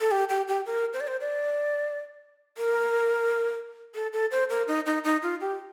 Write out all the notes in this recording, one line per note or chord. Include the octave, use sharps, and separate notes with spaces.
A4
G4
G4
G4
A#4
C5
D5
C5
D5
A#4
A4
A4
C5
A#4
D#4
D#4
D#4
F4
G4